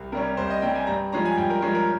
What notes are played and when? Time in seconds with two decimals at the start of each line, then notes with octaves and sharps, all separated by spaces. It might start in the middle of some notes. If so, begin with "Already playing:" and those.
Already playing: C2
0.12 C3 G3 C#4 A#4
0.37 C2 C5
0.50 D#5
0.62 C3 G3 C#4 G5
0.75 G#5
0.87 G2 A#5
1.12 F3 G#3 C#4 A#5
1.25 G#5
1.37 G2 G5
1.50 A#4
1.62 F3 G#3 C#4
1.74 A#4